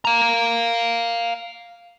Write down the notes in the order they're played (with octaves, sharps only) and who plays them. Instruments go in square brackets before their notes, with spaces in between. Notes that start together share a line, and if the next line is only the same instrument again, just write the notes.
[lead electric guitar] F5 A#5